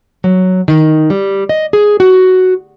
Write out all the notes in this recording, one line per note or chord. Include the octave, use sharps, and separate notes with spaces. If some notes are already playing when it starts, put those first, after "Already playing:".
F#3
D#3
G3
D#5
G#4
F#4